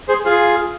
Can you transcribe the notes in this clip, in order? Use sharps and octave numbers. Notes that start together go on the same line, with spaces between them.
G#4 C5
F4 G#4